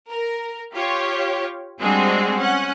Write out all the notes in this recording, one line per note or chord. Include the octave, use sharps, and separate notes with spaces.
A#4
F4 G4 C#5
G3 G#3 C4 D4 F#4 G#4
C#4 F#5